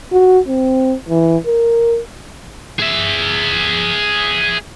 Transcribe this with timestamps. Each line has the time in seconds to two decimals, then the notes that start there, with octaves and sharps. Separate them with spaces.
0.12 F#4
0.48 C4
1.09 E3
1.47 A#4
2.79 G#4 E5